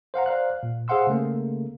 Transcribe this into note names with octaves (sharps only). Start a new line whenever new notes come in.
C5 F5 F#5 A#5
C5 D5 F5 F#6
A#2
G#4 C5 F5 F#5 C6 E6
C#3 A3 A#3